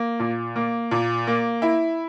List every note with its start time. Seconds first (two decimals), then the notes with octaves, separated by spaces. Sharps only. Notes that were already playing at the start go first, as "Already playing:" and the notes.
Already playing: A#3
0.20 A#2
0.56 A#3
0.91 A#2
1.27 A#3
1.62 E4